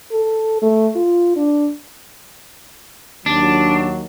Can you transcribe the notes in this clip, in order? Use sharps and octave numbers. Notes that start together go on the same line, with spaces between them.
A4
A3
F4
D4
D#2 F#3 D4